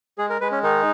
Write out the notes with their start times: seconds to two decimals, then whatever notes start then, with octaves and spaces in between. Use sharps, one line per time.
0.18 G#3 G#4
0.30 A#4
0.40 G#3 B4
0.51 C#4
0.63 D#3 D#4